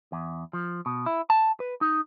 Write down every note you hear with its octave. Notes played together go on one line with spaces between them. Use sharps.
E2
F3
B2
E4
A5
B4
D#4